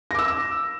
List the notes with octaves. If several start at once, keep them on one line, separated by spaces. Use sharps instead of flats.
D6 E6 A#6